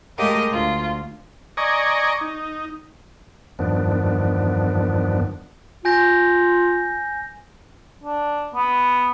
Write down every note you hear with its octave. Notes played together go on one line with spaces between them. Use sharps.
G#3 A3 G4 A#4 D#5 F5
D2 F4
D5 D#5 G#5 A#5 C#6
D#4
E2 G2 D#3 F3 B3 D4
F4 G#5 G6 A#6
D4
B3